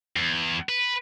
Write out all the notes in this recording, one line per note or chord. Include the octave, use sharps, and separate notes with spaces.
E2
B4